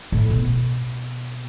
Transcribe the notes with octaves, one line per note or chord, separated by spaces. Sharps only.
A2
B2